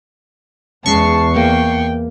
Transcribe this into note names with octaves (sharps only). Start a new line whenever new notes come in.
E2 G#3 C#4 A5 C#6 C7
A#3 G5